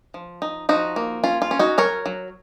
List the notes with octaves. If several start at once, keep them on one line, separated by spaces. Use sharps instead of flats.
F3
D#4
F3 D#4 F#4
A#3
C#4 F4
F4
C#4
D#4 F#4
F#3 A#4 C#5
F#3